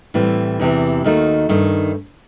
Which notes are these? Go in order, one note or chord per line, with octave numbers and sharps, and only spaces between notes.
A2 E3 G3 C4
E2 C3 E3
D#2 D#3 A3 D#4 F#4
G2 D#3 A3